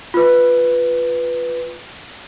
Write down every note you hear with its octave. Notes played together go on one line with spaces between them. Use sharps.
F4 B4